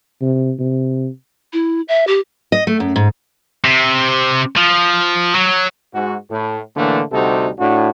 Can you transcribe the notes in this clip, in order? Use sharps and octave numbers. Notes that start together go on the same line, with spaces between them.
C3
C3
E4
E5
G4
D#5
A3
F#2
G#2
C3
F3
F#3
G#2 F#4
A2
A2 D3 E3 A3 A#3 D4
D2 C3 G3 D#4 F#4 A4
A2 D4 F#4